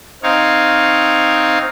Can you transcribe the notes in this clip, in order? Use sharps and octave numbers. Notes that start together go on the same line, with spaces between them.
C4 D#4 C#5 F5